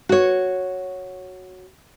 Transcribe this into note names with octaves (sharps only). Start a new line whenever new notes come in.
F#4 C#5